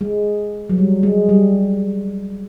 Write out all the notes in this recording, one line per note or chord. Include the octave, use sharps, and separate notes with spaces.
G#3
F#3
G3
G#3
G3